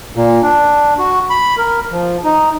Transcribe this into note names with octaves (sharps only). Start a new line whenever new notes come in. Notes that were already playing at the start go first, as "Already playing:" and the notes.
A#2
D4
F#4
B5
A#4
F3
D#4